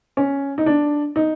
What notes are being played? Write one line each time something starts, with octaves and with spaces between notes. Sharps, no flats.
C#4
D#4
D4
D#4